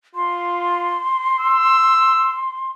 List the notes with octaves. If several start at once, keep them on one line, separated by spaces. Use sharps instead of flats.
F4 C6
E6